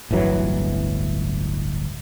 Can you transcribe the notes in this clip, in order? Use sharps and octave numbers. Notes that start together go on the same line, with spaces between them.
D1 G1 E3 F#3